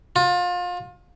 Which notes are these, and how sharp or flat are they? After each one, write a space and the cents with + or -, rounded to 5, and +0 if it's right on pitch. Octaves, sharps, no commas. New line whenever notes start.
F4 +30